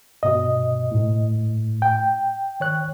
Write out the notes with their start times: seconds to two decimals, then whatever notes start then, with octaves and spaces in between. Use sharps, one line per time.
0.23 G2 B2 D#5
0.91 A2
1.82 G5
2.60 D#3 C#5 F#6